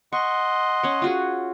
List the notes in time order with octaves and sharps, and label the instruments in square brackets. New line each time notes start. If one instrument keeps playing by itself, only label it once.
[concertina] D#5 F#5 C6 [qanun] C#6
[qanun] C#4 C#5
F4 F#4 G#4